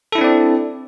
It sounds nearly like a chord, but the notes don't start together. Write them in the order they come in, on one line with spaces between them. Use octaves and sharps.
A4 E4 D4 C4 D5